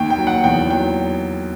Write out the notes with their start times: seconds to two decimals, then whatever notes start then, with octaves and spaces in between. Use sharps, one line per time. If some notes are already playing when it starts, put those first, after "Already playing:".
Already playing: D#2 G5
0.10 G5
0.18 F#3
0.27 F#5
0.44 E2 G5
0.70 F#3 G5